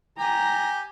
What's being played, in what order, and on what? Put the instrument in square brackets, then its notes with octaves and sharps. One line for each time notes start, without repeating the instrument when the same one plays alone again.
[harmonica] G4 G#5 [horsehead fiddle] A#5